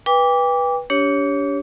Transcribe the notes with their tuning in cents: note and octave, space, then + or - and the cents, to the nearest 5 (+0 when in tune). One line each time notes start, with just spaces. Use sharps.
B4 -15 G5 +35 D6 -20
D4 -40 G4 +0 C#5 +0